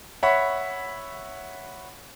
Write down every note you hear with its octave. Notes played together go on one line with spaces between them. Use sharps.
C#5 E5 F#5 B5